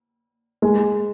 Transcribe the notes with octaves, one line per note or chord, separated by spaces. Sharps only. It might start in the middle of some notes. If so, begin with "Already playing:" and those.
G#3